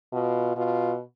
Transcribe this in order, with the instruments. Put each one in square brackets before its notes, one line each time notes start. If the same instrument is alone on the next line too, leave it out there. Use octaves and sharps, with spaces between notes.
[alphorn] B2 [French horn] F4
[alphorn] B2 [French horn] F4